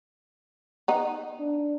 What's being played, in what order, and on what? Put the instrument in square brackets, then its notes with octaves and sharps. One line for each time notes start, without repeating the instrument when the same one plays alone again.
[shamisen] B3 D#4
[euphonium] D4